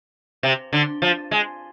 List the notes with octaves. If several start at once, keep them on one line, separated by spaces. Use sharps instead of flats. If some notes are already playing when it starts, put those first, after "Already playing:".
C3
D3
F3
G#3